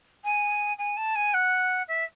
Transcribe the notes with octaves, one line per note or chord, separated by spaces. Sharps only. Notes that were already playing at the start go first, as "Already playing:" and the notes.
G#5
G#5
A5
G#5
F#5
E5